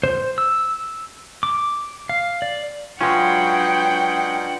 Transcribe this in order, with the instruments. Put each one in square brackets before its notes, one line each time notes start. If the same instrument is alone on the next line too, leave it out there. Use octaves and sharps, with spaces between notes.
[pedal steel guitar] C5
E6
D6
F5
D5
[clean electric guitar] F#3 G#3 C#4 [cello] D4 F#5 [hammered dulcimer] F4 B4 [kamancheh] G5